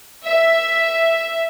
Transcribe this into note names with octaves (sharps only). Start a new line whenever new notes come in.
E5